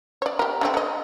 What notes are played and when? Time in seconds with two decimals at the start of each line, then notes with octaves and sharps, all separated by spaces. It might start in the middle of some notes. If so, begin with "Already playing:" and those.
0.22 C#5 D5
0.39 G4 A#4
0.61 D3 A3 C4
0.74 D3 D#5